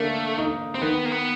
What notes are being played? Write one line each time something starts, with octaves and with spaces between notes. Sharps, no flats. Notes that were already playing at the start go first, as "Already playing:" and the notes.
Already playing: D3 A3 A#3
D#4
C4
D#3 B3
A#3
B3